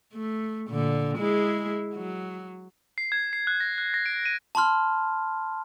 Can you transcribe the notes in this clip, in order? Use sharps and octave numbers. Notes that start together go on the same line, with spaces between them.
A3
A#2 D3
G#3 E4 G#4
F#3
C7
G#6
C7
F#6
A#6
F#6
A#6
D7
D#7
A5 B5 C6 F6